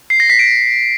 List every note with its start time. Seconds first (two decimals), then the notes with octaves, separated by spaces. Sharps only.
0.10 C7
0.20 A#6
0.30 B6
0.39 D7